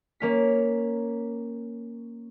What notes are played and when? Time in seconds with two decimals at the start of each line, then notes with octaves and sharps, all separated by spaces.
0.20 A#3 C#4 B6